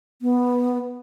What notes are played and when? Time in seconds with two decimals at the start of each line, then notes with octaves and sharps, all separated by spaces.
0.22 B3